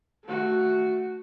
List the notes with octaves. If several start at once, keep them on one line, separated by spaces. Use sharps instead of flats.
A3 F#4